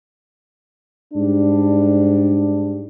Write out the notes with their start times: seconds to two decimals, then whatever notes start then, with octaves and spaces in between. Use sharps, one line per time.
1.14 G#2 G3 D4